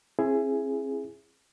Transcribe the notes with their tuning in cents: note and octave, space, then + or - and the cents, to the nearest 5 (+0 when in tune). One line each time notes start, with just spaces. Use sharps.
C4 +40 E4 +20 G#4 +0